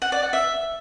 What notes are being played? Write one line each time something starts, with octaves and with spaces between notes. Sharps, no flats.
F#5
D5
F#5
E5